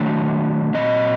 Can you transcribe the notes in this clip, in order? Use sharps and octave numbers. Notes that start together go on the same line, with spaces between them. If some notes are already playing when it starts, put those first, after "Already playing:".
Already playing: D#3 F#3 A3 D4 D#5
A#2 F#3 C4 D#5